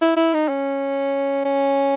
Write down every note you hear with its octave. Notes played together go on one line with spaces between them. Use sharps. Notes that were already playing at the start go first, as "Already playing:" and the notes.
E4
E4
D#4
C#4
C#4